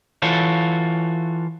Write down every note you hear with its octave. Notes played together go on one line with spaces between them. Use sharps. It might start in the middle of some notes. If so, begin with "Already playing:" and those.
E3 F4 F#4 A4 C#5